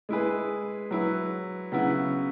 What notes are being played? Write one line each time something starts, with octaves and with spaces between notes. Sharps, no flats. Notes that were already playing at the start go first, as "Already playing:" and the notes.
G#3 E4 G#4 B4
F#3 E4 B4
C#3 F#3 B3 E4